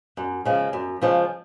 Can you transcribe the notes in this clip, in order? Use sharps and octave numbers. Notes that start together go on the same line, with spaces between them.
F#2
C#3 F3 G#3
F#2
C#3 F3 G#3